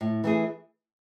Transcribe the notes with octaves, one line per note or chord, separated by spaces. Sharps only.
A2
E3 A3 E4 G#4